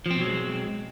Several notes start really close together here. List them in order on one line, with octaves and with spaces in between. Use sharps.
F3 C4 B2 F#3 G#3